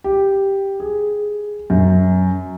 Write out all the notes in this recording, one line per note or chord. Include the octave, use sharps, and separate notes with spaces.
G4
G#4
F#2